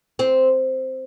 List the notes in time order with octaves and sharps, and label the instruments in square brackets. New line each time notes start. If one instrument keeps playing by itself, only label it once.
[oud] C4